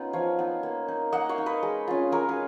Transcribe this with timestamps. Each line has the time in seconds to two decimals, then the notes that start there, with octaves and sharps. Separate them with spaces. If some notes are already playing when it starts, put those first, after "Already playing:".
Already playing: B3 C#4 D#4 F4
0.13 F3 C#5 F5
0.39 B3 D#4
0.63 A#3
0.88 D#4
1.12 A#3 D#5 F#5
1.29 C#5 F5
1.38 D#4
1.46 B4 D#5
1.63 G#3
1.88 C#4 F4
2.12 G#3 A#4 C#5
2.29 G#4 B4